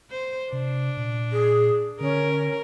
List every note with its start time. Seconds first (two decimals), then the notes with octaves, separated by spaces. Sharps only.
0.11 C5
0.53 C3 D4
0.97 A#2
1.32 G#4
2.01 D3 C#4 A#4